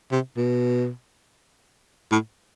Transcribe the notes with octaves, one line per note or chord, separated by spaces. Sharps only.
C3
B2
A2